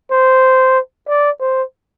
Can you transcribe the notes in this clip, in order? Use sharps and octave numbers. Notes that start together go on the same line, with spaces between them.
C5
D5
C5